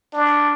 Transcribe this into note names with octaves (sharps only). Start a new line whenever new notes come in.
D4